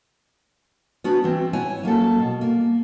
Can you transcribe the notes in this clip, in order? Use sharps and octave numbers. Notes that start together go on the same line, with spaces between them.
B3 C#4 D4 F#4
E3 C4
E4 C#5 F#5 G#5
F#3 A#3 C#4 A4
B2
A#3